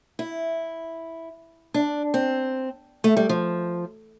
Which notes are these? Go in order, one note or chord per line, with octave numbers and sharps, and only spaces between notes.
E4
D4
C4
A3
G3
F3